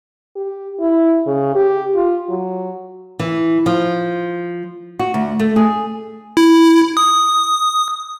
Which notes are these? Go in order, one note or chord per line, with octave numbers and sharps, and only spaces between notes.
G4
E4
C#3
G4
F4
F#3
E3
F3
F#4
D2
A3
G#4
E4
D#6